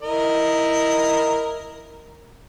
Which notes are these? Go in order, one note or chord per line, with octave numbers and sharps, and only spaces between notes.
E4 A#4 D#5